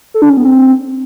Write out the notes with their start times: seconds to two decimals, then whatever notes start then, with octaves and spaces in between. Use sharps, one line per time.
0.14 A4
0.22 D4
0.30 C#4
0.37 B3
0.45 C4